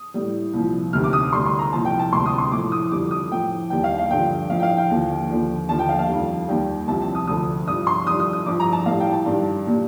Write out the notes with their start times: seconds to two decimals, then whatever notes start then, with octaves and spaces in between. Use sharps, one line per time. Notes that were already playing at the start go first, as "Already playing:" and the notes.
Already playing: D#6
0.14 A2 G3
0.53 C2 A#2 F3
0.93 D2 C3 D#3 F6
1.04 D6
1.13 D#6
1.33 D2 D3 G3 C6
1.46 C6
1.59 A#5
1.72 C2 A#2 F3 A5
1.85 G5
1.99 A5
2.12 D2 C3 G3 C6
2.26 D#6
2.38 C6
2.52 A2 F3 D6
2.72 D#6
2.91 F2 D3 G3 D6
3.11 D#6
3.31 A2 F3 G5
3.70 D#2 D#3 G3 G5
3.84 F5
3.98 F5
4.11 G2 D3 F3 G5
4.50 A2 F3 F5
4.59 G5
4.63 F5
4.77 G5
4.90 D#2 D3 F3
5.30 D#2 D3 F3
5.69 D#2 D3 F3 A5
5.79 G5
5.89 F5
5.99 F5
6.08 F2 D#3 G3
6.48 D#2 D#3 G3 G5
6.88 C2 C3 F3 A5
7.01 A5
7.15 D#6
7.27 D2 D3 F3 D#6
7.67 G2 F3 D#6
7.87 C6
8.07 F2 D#3 G3 D#6
8.20 D#6
8.33 D#6
8.46 G2 F3 D6
8.60 A#5
8.72 A5
8.86 A2 G3 F5
9.00 G5
9.13 A5
9.26 G2 D#3 G3
9.67 A#2 G3